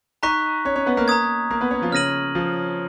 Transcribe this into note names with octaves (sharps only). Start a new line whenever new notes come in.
D#4 D#5 A#5 C#6 F#6 B6
C#4 C#5
C#4 C#5
B3 B4
A#3 A#4
A#5 D#6 G#6
A#3 A#4
B3 B4
C#4 C#5
F3 F4
C#3 C#4 F6 A#6 D#7 F#7
F3 F4